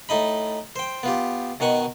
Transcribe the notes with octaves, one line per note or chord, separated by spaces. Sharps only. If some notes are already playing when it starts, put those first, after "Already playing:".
A2 D#4 D#5 B5
C5 G5
B3 F4 G4
B2 D#3 F#5 G#5 C#6